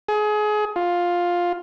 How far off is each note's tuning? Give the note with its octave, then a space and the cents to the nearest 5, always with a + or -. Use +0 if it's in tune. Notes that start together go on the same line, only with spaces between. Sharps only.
G#4 +30
F4 +10